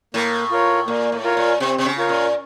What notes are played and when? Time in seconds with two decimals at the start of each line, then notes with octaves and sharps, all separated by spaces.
0.14 A2 A#3
0.51 F4 A#4 C#5
0.87 A#2 A#3
1.12 A2
1.24 F4 A#4 C#5
1.37 A#2
1.60 C3 C4
1.78 C3
1.85 C#3
1.97 F4 A#4 C#5
2.09 A#2